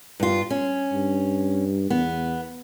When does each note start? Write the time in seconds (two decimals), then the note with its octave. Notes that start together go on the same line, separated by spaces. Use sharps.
0.20 G2 F4
0.50 C#4
0.92 G2
1.90 E2 B3